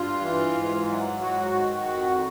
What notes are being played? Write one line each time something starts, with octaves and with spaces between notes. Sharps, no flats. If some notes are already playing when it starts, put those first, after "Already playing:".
Already playing: G2 F4
E3
G#2
F#3
G#2 F#4
D#3
F2